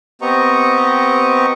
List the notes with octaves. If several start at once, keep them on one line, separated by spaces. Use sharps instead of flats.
B3 C4 G4 D#5 A#5 C#6